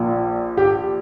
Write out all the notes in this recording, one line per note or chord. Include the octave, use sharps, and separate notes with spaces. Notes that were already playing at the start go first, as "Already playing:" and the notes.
Already playing: A#1 A#2
G4